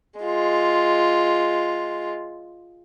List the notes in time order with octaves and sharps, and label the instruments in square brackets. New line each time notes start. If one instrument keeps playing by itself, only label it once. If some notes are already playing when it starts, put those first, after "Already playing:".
[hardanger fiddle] G#3 F4